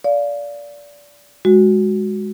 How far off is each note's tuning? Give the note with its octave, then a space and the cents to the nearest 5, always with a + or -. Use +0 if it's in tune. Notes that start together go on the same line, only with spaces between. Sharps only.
D5 -20 F5 +0
G#3 -5 F#4 +0